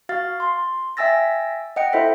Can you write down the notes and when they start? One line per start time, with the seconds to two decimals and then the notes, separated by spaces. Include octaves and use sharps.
0.09 F#4 F5 F6 A6
0.40 C6
0.97 E5 G5 G#5 E6 A6 A#6
1.76 D#5 F#5 G5 C#7
1.93 E4 A4 C5 D#5 E5